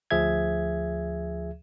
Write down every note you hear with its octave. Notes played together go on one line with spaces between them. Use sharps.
D2 F3 G#4 E5 G#6